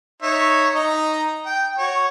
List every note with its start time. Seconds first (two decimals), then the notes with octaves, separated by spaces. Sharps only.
0.22 D#4 C#5 E5
0.75 D#4 D#5 A#5
1.46 G5
1.78 F#4 C#5